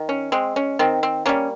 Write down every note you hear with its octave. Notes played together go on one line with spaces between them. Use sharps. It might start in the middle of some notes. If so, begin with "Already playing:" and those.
Already playing: D#3
C#4
G#3 C4
C#4
D#3 C4
C4
G3 A#3 C#4